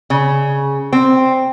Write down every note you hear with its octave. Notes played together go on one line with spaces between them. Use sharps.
C#3
C4